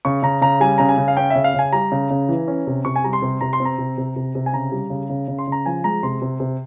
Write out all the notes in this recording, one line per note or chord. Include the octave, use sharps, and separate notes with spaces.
C#3 C#6
C#3 A#5
C#3 A#5
G3 G#5
C#3 A#5
G#5
C#3
F5
C#4 G5
E5
C#3
F5
C#3 G#5
G3 A#5
C#3
C#3
E3
C#4
C3
C3 C#6
G#5
G3 A#5
C6
C3
C3 A#5
C6
C4
A#5
C3
C3
C3
C3
G#5
C#3 A#5
G3
C#3
C#3
C#3
C6
C#3 A#5
F3 G#5
G#3 A#5
C3 C6
C3
C3